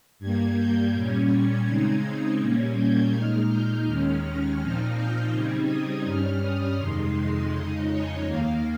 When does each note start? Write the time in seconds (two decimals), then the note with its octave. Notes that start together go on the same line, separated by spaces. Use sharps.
0.19 G2 G3 A#3 G#6
0.56 G6
0.92 A#2 G3 C#4 G#6
1.30 G#6
1.66 C#3 G#3 C4 D#4
2.39 A#2 G3 A#3 C#4 G#6
2.76 G6
3.12 A#2 G#3 D#4 F6
3.49 G6
3.85 D#2 D#3 G#3 C#4 F6
4.59 A#2 F3 C4 D#4
4.95 G6
5.32 C#3 G3 C4 D#4 G#6
5.68 D#6
6.04 G2 G3 C#4 F6
6.41 D#6
6.77 F2 C3 D#3 G#3 D#4 C6
7.51 F2 C#3 G#3 D#4 D#5
7.87 C#5
8.24 D#2 D#3 A#3 F5